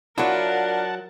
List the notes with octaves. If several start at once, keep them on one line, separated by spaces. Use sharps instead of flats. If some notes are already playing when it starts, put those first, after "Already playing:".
F#3 D4 E4 F4 A#4 F#5 A5